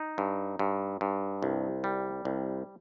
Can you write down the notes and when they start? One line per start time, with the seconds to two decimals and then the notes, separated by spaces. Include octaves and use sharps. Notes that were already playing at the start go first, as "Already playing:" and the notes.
Already playing: D#4
0.18 G2
0.59 G2
1.01 G2
1.43 C2
1.84 G3
2.25 C2